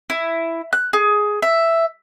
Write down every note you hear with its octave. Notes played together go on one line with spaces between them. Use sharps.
E4
F#6
G#4
E5